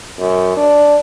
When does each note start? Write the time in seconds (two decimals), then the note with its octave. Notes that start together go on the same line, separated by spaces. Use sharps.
0.20 F#2
0.57 D4